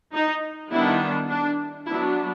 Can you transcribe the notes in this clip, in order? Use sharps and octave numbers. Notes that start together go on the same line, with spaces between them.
D#4
D#3 G3 B3 D4 E4
D4
F#3 B3 D4 E4